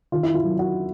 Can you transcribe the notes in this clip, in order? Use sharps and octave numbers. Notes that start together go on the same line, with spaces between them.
D#3 F4
E4
F4
F#3
F#4